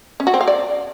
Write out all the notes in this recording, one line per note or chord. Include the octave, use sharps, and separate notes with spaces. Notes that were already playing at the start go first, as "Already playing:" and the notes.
C#4
F#4
C4
F5
D5